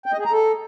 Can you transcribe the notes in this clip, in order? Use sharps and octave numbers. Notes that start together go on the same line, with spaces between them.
G5
D#5
G#4
A#5
A4